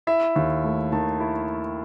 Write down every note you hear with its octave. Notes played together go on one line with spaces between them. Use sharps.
E4 E5
D#2
A3
D#3 A5
E4